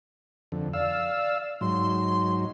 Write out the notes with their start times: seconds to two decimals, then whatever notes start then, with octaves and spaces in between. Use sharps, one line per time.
0.52 F2 D3
0.74 D5 F5 E6
1.61 G#2 F#3 C6